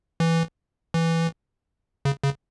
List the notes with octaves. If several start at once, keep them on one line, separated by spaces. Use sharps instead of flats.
E3
E3
C#3
C#3